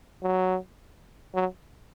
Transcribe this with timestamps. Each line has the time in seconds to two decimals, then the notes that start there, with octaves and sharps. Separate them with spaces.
0.23 F#3
1.34 F#3